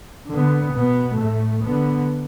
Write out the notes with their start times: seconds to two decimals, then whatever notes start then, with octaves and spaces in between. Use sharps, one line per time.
0.31 D3 B3
0.75 B2 B3
1.20 A2 A3
1.64 D3 B3